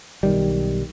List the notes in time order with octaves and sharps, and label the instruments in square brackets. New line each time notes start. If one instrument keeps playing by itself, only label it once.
[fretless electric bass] B1 D#3 G3